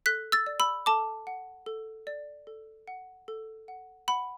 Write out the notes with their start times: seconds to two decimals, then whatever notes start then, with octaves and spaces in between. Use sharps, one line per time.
0.06 A4 F#6 B6
0.32 E6 A6
0.47 D5
0.60 B5 E6
0.86 A4 A5 D6
1.27 F#5
1.66 A4
2.07 D5
2.47 A4
2.88 F#5
3.28 A4
3.68 F#5
4.08 F#5 B5